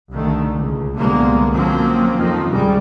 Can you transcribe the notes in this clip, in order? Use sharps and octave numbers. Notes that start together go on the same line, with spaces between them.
C2 D3 D#3 A3
C#2
C2 A#2 D3 G#3 A#3 B3
F3 F#3 A#3 C4 C#4
F2 D#3 F3
C2 F#2 G3 G#3